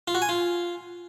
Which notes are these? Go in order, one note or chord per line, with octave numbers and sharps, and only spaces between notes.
F4
F#4
G#5
F4